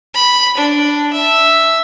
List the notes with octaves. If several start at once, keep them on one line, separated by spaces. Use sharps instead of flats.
B5
D4
E5